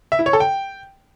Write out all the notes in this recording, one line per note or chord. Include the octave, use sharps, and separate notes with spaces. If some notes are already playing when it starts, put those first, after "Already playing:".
E5
E4
C#5
A4
G5